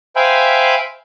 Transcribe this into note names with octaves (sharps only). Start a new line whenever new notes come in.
C5 E5 F5 G5 G#5 B5